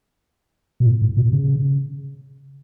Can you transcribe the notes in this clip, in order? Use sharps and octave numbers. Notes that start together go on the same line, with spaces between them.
B2
A2
A2
B2
C#3